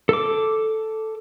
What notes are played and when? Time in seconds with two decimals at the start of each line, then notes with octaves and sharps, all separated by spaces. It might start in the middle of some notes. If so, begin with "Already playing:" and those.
0.09 A4 D6